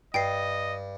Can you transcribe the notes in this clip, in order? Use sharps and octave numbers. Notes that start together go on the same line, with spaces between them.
G2 D#5 G5 C7